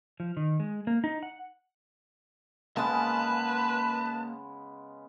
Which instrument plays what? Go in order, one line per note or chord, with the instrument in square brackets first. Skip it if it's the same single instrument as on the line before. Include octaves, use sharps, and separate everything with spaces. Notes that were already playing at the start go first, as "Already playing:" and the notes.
[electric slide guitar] F3
D#3
G#3
A#3
D#4
F#5
[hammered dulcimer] C#3 G#3 B3 [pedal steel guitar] A#3 G#5 F#6 [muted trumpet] B4 [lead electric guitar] A5